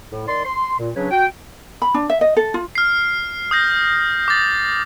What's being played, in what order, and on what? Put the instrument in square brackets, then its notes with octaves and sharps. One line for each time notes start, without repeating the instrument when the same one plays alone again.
[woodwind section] A2
D#3 D5 C6
C6
A#2
C#3 F#3 D4 B4 C#5
F#4 G5
[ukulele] B5
D4
E5
D#5
A4
F4
[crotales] F6 C7
D#6 G6 A#6
D6 A6